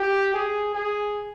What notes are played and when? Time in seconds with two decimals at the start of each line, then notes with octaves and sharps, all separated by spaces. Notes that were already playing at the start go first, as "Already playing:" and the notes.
Already playing: G4
0.34 G#4
0.75 G#4